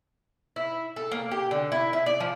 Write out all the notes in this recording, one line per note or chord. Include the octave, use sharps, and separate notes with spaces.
E4
A4
A#3
G4
D3
E4
E4
D5
F3